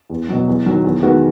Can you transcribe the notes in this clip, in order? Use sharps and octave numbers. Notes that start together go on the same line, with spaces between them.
E2
B2 F#3
E2
D#3 F#3
E2
D#3 G#3 B3 F#4